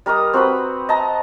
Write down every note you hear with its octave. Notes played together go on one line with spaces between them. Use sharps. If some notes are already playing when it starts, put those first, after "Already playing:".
G3 A#4 D#5 D#6
C4 F#4 B4 B5
D#5 A5 A#5